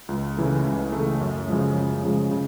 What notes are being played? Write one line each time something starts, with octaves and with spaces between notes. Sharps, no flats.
C#2
C#3 E3 A3
C#2
C#3 E3 A3
F#2
C#3 F3 G#3
F#2
C#3 F3 G#3
C#3